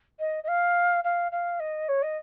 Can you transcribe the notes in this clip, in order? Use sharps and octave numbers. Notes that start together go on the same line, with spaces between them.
D#5
D#5
F5
F5
F5
D#5
C#5
D#5